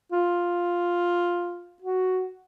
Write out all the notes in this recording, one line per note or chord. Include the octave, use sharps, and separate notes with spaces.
F4
F#4